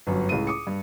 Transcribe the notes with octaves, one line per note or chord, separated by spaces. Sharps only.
G1 F#2
C#2 A2 D#7
D6 D#6 C#7
G2